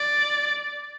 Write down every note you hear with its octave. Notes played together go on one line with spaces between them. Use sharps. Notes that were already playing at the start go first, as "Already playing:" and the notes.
Already playing: D5